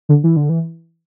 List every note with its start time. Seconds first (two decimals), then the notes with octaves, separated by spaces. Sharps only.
0.09 D3
0.24 E3
0.36 D3
0.49 E3